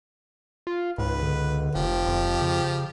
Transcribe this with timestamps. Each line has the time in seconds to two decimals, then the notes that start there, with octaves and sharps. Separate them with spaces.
0.67 F4
0.98 C#2 G#2 B4
1.22 D3
1.75 F1 F3 G4
2.07 E1 F2
2.41 C#3